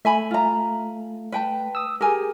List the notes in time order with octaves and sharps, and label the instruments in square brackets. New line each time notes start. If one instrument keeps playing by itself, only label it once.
[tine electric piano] A3 [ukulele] E5 G#5 B5
[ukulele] F4 A#5
B4 G5 A5
[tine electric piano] D#6 E6
[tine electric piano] G4 G#4 [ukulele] A#4 G#5